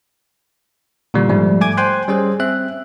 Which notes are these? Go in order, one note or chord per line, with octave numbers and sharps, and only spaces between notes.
A#2 D3 E3 G3
G#2 F3 G3 A3
A3 G#5 D6 G#6
C5 G5 G#5 C6 F#6
G3 C#4 G#4 C5
C4 E5 F#6